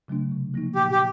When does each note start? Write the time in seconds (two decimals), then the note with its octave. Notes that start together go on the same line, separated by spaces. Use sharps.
0.08 C#3 F#3 A3 D4
0.32 C3
0.54 F3 A#3 D#4
0.75 A#2 G4
0.92 G4